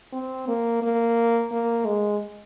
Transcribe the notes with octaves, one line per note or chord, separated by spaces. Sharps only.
C4
A#3
A#3
A#3
G#3